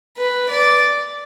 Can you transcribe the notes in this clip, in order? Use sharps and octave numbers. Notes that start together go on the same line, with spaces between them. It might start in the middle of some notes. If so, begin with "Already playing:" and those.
B4
D5